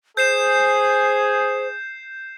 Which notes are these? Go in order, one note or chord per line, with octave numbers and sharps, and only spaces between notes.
G#4 C5 G6 C7 E7